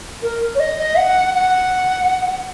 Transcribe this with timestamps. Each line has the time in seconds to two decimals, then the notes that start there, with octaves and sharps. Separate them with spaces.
0.22 A#4
0.55 C#5
0.60 D#5
0.79 D#5
0.98 F#5
1.34 F#5